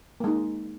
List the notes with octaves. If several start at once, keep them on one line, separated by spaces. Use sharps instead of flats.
G#3 A#3 D#4